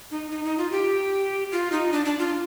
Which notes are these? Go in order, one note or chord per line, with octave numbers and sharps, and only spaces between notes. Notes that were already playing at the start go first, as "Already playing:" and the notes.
D#4
D#4
D#4
F4
G4
F4
D#4
D4
D4
F4